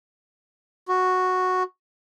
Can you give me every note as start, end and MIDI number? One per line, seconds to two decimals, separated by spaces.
0.88 1.63 66